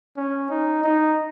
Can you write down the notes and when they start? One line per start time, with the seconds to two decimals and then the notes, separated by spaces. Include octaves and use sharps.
0.17 C#4
0.50 D#4
0.84 D#4